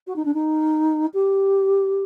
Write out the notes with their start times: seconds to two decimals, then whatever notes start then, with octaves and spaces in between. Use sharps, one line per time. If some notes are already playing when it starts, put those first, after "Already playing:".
0.07 F#4
0.16 D#4
0.25 D4
0.34 D#4
1.13 G4